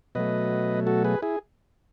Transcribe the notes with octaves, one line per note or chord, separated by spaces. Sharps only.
B2 F#3 A3 B4 D#5
F#4 A4
G#4 B4
E4 G#4